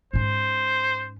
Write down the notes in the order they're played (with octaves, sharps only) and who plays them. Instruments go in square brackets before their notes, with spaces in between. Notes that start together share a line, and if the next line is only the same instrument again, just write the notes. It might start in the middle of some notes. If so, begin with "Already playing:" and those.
[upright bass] G#2 C#4 [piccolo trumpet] C5